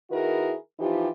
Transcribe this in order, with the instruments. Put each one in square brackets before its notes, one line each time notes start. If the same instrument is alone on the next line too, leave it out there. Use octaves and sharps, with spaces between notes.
[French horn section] D#3 E4 F#4 G#4 A#4 B4
E3 F3 D#4 F4 G4